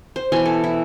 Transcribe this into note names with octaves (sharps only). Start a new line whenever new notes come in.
C5
B2 E3 G#5 C6
A4
E4